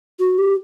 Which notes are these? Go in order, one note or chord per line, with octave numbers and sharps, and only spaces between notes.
F#4
G4